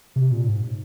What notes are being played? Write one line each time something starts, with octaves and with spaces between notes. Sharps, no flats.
C3
A#2
G#2